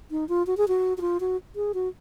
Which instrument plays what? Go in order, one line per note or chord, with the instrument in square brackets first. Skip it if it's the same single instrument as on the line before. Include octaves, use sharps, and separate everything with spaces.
[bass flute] D#4
F4
F#4
G#4
F#4
F#4
F4
F#4
G#4
F#4